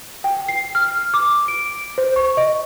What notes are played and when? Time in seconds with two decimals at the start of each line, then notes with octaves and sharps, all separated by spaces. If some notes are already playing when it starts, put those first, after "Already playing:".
0.24 G5
0.49 C7
0.75 F6
1.14 D6
1.48 D7
1.98 C5
2.16 C#6
2.37 D#5